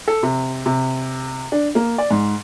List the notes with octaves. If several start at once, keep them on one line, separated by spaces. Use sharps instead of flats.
A4
C3
C3
D4
A#3
D5
G#2